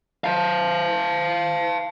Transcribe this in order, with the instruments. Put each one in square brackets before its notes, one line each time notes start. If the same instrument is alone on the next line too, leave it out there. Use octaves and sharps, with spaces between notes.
[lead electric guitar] F5 A5